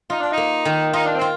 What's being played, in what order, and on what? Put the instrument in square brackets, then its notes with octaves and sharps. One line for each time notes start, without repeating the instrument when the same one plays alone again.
[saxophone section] D#4 [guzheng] F4
[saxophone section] D4
D#4
[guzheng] A#3
D#3
[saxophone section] D#4 [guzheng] F4
[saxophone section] D4
C4
[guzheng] F4